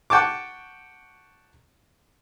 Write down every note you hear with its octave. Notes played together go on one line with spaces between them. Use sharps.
F#5 G5 A5 C#6 D6